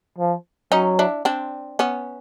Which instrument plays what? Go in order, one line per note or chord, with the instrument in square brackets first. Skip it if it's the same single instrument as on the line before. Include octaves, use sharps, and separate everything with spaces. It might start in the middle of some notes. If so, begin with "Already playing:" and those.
[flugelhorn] F3
[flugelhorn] F#3 [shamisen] C#4 D#4
[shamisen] D4 E4
C4 D4
B3 C#4